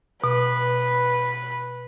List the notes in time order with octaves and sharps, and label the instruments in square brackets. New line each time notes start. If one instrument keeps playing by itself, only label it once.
[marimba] B2 [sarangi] B4